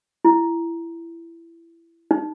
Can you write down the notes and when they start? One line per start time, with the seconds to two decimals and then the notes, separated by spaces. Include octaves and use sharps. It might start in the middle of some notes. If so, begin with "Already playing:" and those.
0.25 E4
2.11 D#4